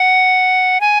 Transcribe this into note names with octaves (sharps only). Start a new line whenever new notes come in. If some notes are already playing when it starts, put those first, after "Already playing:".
Already playing: F#5
G#5